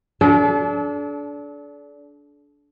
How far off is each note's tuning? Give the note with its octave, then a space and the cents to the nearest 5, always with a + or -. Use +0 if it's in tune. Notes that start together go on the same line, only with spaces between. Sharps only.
D4 -25 A4 -40